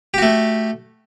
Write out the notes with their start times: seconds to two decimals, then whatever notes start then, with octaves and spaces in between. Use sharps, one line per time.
0.14 G4
0.18 F#4
0.22 A3